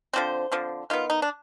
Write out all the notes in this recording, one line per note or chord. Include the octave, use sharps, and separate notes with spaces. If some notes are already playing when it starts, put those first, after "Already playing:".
D3 F3 C4 C5
D3 F3 C4
D#3 B3 F4
D#4
D4